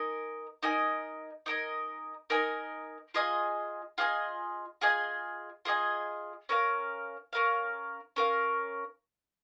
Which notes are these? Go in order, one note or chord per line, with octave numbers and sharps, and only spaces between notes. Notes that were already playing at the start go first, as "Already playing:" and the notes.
Already playing: D#4 A#4 D#5 G#5
D#4 A#4 D#5 G#5
D#4 A#4 D#5 G#5
D#4 A#4 D#5 G#5
F4 G#4 D#5 G#5
F4 G#4 D#5 G#5
F4 G#4 D#5 G#5
F4 G#4 D#5 G#5
C#4 A#4 F5
C#4 A#4 F5
C#4 A#4 F5